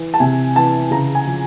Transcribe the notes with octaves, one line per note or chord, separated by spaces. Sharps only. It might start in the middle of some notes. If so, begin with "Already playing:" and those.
Already playing: E3
A5
C3 G#5
E3 A5
C#3 A#5
G#5
F3